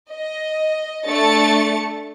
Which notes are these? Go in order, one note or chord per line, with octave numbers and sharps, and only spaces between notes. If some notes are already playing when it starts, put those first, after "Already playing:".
D#5
A3 D4 A6 C#7